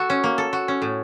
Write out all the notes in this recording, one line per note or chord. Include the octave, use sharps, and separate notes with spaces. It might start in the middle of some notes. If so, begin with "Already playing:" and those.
Already playing: F#4 A4
C#4
A#3
A4
F#4
C#4
A2